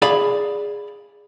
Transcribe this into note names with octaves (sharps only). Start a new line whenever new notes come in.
G#4 D5 F5 B5